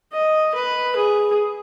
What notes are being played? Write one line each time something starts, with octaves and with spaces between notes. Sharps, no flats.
D#5
B4
G#4